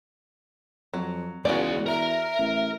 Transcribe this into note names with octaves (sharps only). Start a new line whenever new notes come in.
F2 F#3
E2 G#3 C#4 F#4 G#4 D5
A#4 E5 A#5
A1